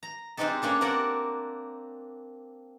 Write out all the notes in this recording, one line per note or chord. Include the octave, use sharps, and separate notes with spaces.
A#5
G#3 C4 D4 D#4 G4 A4
A#3 C#4 D4 A4
A#3 C4 F#4 A#4 D5 F#5